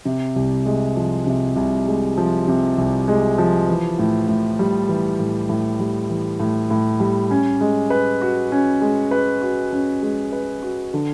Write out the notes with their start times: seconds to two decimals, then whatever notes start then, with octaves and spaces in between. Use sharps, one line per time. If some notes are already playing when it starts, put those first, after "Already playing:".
0.05 C3
0.36 C2
0.66 G#3
0.96 F3
1.27 C3
1.56 C2
1.87 G#3
2.17 F3
2.48 C3
2.78 C2
3.08 G#3
3.38 F3
3.68 E3
3.99 A2
4.28 A2
4.59 G3
4.89 E3
5.19 A2
5.49 A2
5.80 G3
6.10 E3
6.40 A2
6.71 A2
7.00 G3
7.31 C#4
7.61 G#3
7.90 B4
8.22 F#4
8.52 C#4
8.81 G#3
9.11 B4
9.42 F#4
9.72 C#4
10.02 G#3
10.32 B4
10.63 F#4
10.94 D3